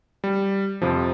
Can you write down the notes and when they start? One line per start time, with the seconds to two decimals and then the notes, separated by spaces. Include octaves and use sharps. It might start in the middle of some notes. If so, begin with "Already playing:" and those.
0.24 G3
0.82 F2 C3 F3